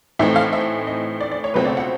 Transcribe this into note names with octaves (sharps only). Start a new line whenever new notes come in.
A2 E3 A3 C4 D#4 E5
F5
E5
D#5
D5
D5
C#5
C#2 B2 F#3 A3 C4 B4
D5
F#5